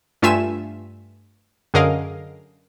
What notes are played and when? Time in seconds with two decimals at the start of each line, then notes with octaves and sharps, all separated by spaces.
0.22 G2 A3 F4 E5 G#5 E7
1.74 F#2 D3 G#4 A#4 D#5 F5